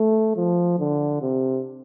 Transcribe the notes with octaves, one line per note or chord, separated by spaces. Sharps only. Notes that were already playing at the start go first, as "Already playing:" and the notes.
Already playing: A3
F3
D3
C3